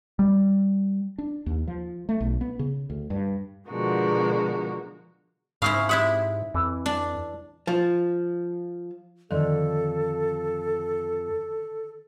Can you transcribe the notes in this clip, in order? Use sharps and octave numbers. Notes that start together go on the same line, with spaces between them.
G3
D4
D#2
F3
A3
B1
B3
C#3
D2
G2
B2 D3 F3 G#3 F#4 A#4
G#2 C#3 E4 A#4 C5 F5
G#3 E4 G4 E5 F#5
F2 E3
D4
F3
F2 D3 D#3 A4